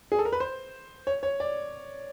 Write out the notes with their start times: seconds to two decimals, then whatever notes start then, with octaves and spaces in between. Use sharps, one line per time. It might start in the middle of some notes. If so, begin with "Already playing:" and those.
0.12 G#4
0.19 A4
0.25 A#4
0.32 B4
0.40 C5
1.07 C#5
1.23 C#5
1.40 D5